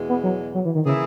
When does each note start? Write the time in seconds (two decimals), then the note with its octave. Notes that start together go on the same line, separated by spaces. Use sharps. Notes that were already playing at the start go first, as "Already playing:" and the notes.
Already playing: E2 B2 G#3
0.09 B3
0.23 F#3
0.54 F#3
0.65 E3
0.75 D#3
0.85 C#3 E3 A#3 E4 G#4